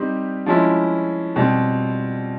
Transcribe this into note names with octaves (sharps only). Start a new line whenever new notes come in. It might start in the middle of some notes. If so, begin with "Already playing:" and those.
Already playing: G3 C4 D#4 G4
F3 G#3 C#4 E4
B2 G3 C4